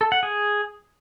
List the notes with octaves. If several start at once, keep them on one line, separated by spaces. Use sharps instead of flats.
A4
F#5
G#4